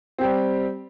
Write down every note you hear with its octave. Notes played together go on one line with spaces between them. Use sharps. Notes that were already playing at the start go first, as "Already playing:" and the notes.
G3 C4 G4